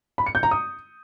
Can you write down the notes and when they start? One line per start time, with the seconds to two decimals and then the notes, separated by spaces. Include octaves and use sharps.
0.18 B5
0.26 C#7
0.35 G6
0.43 A#5
0.51 D#6